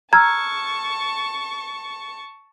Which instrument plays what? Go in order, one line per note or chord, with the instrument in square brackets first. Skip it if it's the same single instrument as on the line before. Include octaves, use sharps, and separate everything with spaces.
[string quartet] A5 C#6 [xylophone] A#5 [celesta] E6 F6 G#6